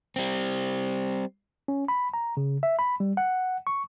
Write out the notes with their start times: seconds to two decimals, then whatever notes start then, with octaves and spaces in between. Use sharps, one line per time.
0.16 G3 C4
1.68 C#4
1.88 B5
2.14 A#5
2.37 C#3
2.63 E5
2.79 B5
3.00 G3
3.17 F#5
3.67 C#6